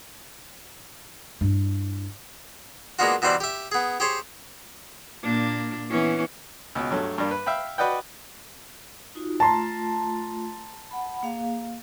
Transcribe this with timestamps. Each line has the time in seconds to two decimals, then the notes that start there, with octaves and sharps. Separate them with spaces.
1.41 G2 E4
2.99 G#3 A#3 B3 D4 F4 F#4
3.22 B2 E3 G3 C5 D5
3.40 G4 E5
3.72 B3 G#4
4.00 G4 G#4 C5 C#5
5.22 A#2 A#3 D4
5.89 E3 B3 C#4
6.75 C#2 B2
6.91 G2 F#3 A3
7.18 G2 G3 A#3
7.31 B4
7.46 E5 F5 G5 B5
7.78 F#4 B4 D5 D#5 F#5 G5
9.15 D#4 F4 F#4
9.40 A3 F4 A5 A#5 C6
10.91 F#5 B5
11.23 A#3 G#4 F5